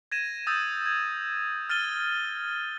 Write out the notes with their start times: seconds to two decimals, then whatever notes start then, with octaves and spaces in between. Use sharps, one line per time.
0.12 G#6 A#6 D#7 E7
0.47 D#6 E6 G6 A6
0.86 G#6
1.69 F6 A6 D#7 G7